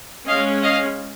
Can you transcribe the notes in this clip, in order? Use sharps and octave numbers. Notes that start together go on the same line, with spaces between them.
G#3 C#4 D#5 F5
D#5 F5